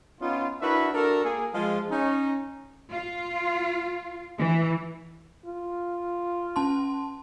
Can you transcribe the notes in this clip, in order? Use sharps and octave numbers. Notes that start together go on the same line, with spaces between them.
B3 C#4 D#4 F4
D4 E4 F#4 A#4 B4 E5
D4 F#4 A4 A#4
A#3 G#4
F3 G#3 F4
C#4 D#4
F4
E3
F4
C#4 A5 C6